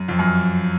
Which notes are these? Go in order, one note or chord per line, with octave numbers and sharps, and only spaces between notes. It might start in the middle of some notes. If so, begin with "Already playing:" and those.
Already playing: F#2
F2
F#2